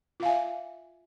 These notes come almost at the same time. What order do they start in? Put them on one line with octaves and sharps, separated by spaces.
F4 F5 G#5 E5